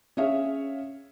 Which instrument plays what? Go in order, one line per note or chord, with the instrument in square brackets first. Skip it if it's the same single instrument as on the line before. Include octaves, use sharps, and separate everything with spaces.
[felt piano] C#4 G#4 C#5 E5 F5